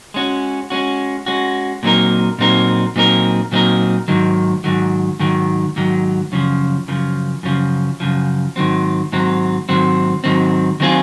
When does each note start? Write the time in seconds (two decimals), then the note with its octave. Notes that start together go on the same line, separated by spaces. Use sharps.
0.14 G#3 C#4 F#4
0.70 G#3 C#4 F#4
1.26 G#3 C#4 F#4
1.83 A#2 F#3 C4 D#4 A#4
2.39 A#2 F#3 C4 D#4 A#4
2.96 A#2 F#3 C4 D#4 A#4
3.52 A#2 F#3 C4 D#4 A#4
4.08 G#2 D#3 F#3
4.64 G#2 D#3 F#3
5.19 G#2 D#3 F#3
5.76 G#2 D#3 F#3
6.32 F#2 C#3 F3
6.88 F#2 C#3 F3
7.43 F#2 C#3 F3
8.00 F#2 C#3 F3
8.56 G#2 D#3 F#3 C4
9.12 G#2 D#3 F#3 C4
9.69 G#2 D#3 F#3 C4
10.24 G#2 D#3 F#3 C4
10.80 D#3 F#3 C4 F4 G#4